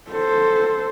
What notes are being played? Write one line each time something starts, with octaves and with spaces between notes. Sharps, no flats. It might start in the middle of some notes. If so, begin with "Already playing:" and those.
A4 C5